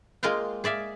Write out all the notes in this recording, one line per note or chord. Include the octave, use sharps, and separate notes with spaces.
G#3 A#3 F4 D#5 F5 G5
G#4 D5 E5 F5